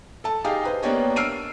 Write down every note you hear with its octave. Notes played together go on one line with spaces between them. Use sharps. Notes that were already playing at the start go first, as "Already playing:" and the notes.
A4 A5
D#4 G4 G#4 D#5 F5
B4 C5
A#3 B3 D4 G4 C#5 D#5
E6 F6 C7 D7 D#7